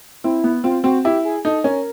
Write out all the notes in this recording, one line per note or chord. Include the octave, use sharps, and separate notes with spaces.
C4 E4
B3
C4 F4
C4 F#4
E4 G4
G#4
D#4 A4
C#4 A#4